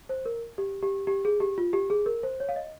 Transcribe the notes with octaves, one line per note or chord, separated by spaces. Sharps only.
C5
A#4
G4
G4
G4
G#4
G4
F4
G4
G#4
A#4
C5
C#5
F5
D#5